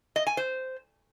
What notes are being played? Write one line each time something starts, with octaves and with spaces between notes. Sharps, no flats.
D#5
G#5
C5